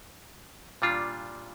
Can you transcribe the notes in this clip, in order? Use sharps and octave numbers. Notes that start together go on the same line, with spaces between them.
A#2 G3 D4 F4